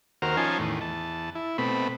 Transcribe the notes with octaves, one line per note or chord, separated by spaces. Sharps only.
D#2 F#4 A#4 C5 F6
F3 C#4 D#4 G#5 A5 C6
E2 A2 D#3
E2 A5
E4
B2 A3 C4 B5